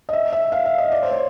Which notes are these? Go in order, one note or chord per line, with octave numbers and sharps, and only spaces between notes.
D#5
E5
E5
F5
E5
D#5
D5
C5
C#5